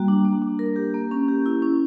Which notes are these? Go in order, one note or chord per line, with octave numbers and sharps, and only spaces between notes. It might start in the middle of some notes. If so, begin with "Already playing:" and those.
Already playing: G3 A#3 F#4
D4
A#3
D4
A#4
G4
A#3
C#4
G4
E4
C#4